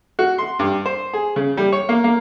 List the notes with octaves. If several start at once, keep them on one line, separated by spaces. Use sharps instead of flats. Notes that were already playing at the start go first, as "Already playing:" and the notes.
F#4
C6
G2
C5
G#4
C#3
G3
C#5
A#3
A#3